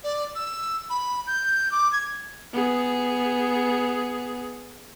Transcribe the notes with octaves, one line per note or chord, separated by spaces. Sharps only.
D5
E6
B5
G6
D6
G#6
B3 G#4